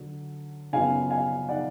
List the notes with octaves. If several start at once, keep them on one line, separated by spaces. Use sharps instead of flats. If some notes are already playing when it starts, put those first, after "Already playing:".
Already playing: D3 F#3
F#2 C#3 F#3 B3 F4 F5 G#5
F5 G#5
D5 F#5